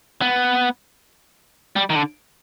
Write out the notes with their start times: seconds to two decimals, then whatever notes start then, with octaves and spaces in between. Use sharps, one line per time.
0.21 B3
1.76 G3
1.90 D#3
1.96 D3